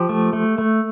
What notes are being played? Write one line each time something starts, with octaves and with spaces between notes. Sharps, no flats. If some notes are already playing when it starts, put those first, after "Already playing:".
Already playing: F3 G4
A3
A3
A3